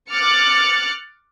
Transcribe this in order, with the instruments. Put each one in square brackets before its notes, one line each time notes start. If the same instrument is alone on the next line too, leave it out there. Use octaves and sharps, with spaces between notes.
[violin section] D6 F6 F#6 A6 C#7